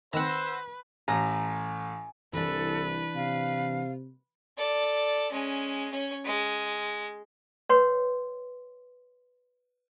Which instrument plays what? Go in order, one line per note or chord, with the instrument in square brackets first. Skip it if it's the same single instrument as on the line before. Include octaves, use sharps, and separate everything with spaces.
[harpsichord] D#3 C4 [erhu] B4 [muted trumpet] C5 [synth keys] F#5 E6 A#6
[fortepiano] A1 A2 [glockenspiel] G#5 [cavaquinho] A#5
[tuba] C2 [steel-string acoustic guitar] E3 D4 [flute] A4 [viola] B4
[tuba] C3 [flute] F5
[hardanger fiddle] A4 D5
G#3 C#4
C#4 C#5
G#3
[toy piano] B4 C#5 F#5 C6